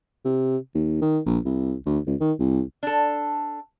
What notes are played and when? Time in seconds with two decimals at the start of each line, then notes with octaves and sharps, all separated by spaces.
0.25 C3
0.75 D#2
1.01 D#3
1.26 A#1
1.45 C2
1.86 D2
2.07 C#2
2.20 D#3
2.39 C2
2.83 D4 A4